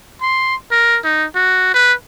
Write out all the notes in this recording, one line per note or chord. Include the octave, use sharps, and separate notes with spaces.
C6
A#4
D#4
F#4
B4